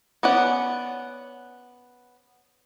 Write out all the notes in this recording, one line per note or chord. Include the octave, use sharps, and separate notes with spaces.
B3 C#4 D5 F#5